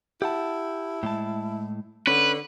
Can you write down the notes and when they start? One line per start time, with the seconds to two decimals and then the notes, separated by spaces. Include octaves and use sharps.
0.22 E4 G4 F#5 A5
1.03 A2 G#3 A5
2.07 D3 C#4 B4 F#5